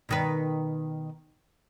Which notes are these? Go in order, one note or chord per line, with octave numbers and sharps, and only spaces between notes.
B2 D#3 B4